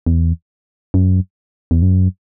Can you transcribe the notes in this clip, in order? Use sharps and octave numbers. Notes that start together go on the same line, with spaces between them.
E2
F#2
E2
F#2